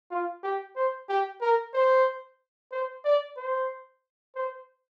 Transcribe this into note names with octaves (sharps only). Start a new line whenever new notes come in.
F4
G4
C5
G4
A#4
C5
C5
D5
C5
C5